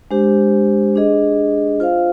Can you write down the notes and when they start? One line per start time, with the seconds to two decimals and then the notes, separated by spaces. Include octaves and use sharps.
0.11 G#3 D4 G4 C5
0.95 D4 G#4 D#5
1.80 F4 C5 F5